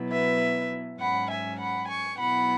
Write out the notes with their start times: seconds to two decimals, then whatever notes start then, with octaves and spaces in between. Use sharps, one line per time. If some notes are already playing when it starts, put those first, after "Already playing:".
Already playing: B2 F#3 B3 E4
0.11 B4 E5
1.00 G#2 F#3 C#4 F#5 B5
1.30 E5 G#5
1.59 F#5 B5
1.89 G#5 C#6
2.18 B2 F#3 B3 E4 F#5 B5